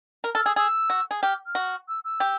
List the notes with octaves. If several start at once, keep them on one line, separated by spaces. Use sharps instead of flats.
A#4
A4 F6
G#4 E6
G#4 E6
F#4
G#4
G4 F6
F6
F#4
E6
E6
G4